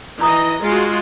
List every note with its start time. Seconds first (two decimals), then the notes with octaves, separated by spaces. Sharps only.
0.21 E3 D#5 A#5 D#6
0.61 G#3 F4 F#4